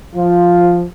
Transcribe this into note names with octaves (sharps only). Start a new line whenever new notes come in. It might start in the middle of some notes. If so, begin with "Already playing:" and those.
F3 F4